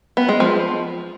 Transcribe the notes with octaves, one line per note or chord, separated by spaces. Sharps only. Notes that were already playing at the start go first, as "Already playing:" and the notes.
B3
G#3
F3